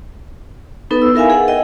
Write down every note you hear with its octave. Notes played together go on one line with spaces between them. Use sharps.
B3 D#4 A4 B4
E6
E4 A#4 E5 F5 G#5
G#4 F#5
D#5 G5